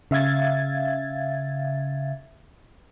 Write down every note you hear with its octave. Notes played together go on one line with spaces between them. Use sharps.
C#3 E5 F5 G#6 A6